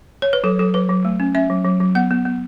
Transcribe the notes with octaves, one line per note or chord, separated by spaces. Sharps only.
C#5
B4
F#3 A4
F#3 A4
F#3 B4
F#3
A3
C#4
C#4 E5
F#3
F#3
F#3
B3 F#5
B3
B3